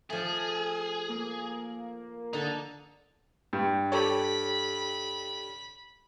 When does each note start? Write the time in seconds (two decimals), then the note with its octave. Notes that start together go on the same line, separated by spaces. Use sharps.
0.10 F3 A3 G#4
1.09 A#3
2.33 D3 D#4 A5
3.53 G2
3.92 G4 A4 C#5 B5